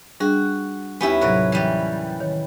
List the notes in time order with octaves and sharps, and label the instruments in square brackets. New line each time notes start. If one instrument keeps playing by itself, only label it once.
[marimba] G3 D4 G#4 [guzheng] F#4
[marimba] D#2 G4 G#5 [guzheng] B3 C#4 E4
[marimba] A2 C3 F#3 [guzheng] A#4 B4 C#5
[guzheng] E3 G3
[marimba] D#3 C#5